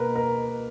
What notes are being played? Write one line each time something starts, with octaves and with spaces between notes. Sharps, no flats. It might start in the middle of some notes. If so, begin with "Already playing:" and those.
Already playing: B2 A#3 A#4 B4
A#4